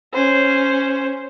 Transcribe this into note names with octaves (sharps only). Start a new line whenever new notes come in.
C#4 C5